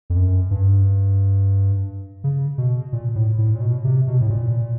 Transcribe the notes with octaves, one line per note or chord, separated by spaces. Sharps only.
F2
F#2
G2
C#3
B2
A#2
A2
A2
A#2
B2
C3
B2
A2
A#2